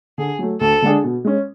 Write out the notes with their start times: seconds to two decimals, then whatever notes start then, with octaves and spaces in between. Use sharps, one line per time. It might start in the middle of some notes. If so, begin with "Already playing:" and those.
0.18 D3 G#4
0.39 F#3 A3
0.61 D2 A4
0.82 D3 G#3 D4 G#4
1.04 B2
1.24 G#3 C#4